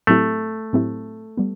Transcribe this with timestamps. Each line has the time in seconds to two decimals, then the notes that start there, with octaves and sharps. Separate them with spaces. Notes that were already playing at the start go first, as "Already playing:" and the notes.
0.07 A2 F#3 A3 C4 E4 G4
0.73 A2 F#3 C4 E4 G4
1.37 G3 B3